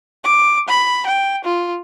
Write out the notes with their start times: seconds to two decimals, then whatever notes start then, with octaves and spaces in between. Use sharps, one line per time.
0.24 D6
0.68 B5
1.06 G5
1.44 F4